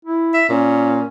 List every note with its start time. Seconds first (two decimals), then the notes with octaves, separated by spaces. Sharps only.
0.05 E4
0.34 E5
0.49 A#2 C#4